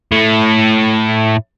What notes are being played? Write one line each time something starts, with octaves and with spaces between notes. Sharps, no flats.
A2 A3